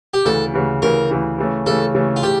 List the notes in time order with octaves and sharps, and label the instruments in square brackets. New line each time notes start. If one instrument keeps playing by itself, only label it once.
[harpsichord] G4
[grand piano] D2 C#3 E3 [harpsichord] A4
[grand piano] D2 C#3 E3
[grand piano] D2 C#3 E3 [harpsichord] A#4
[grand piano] D2 C#3 E3
C#3 E3 A3 C#4
[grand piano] C#3 E3 A3 C#4 [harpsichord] A4
[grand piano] C#3 E3 A3 C#4
[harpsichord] F4
[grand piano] C#3 [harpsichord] G4